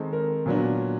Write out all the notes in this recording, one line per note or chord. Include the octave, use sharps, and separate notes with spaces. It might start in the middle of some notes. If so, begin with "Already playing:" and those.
Already playing: D#3 G#3 C4 A4
A#4
A#2 F#3 B3 D4